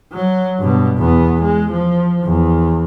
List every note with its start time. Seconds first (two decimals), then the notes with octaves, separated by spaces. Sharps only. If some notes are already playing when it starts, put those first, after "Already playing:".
0.13 F#3
0.59 G2 B2
0.98 E2 B3
1.42 G#3
1.72 F3
2.25 E2